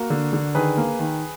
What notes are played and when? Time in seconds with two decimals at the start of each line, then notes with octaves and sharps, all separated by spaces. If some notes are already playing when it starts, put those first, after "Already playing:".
Already playing: A#3 F#4 A#4
0.10 D3
0.33 D3
0.55 D#3 G#4 B4
0.77 A#3
0.99 D#3